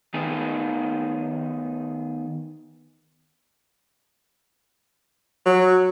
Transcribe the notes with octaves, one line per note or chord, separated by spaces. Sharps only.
D#3 B3 D#4 G#4
F#3